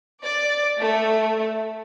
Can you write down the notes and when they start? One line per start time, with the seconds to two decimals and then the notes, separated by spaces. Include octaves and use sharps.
0.24 D5
0.79 A3